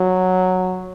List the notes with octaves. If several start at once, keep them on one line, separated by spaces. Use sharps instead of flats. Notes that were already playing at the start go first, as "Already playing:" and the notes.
Already playing: F#3